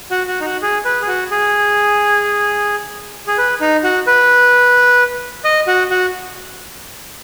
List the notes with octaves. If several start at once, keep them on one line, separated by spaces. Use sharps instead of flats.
F#4
F#4
D#4
F#4
G#4
B4
G#4
F#4
G#4
G#4
B4
D#4
F#4
B4
D#5
F#4
F#4